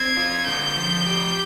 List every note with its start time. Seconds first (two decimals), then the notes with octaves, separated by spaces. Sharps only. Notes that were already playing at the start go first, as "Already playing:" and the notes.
Already playing: C4 G#6
0.17 F4
0.46 D3 G6
0.77 F3
1.07 G4